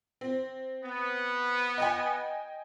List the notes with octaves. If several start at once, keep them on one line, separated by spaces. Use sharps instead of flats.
C4
B3
D#5 G5 G#5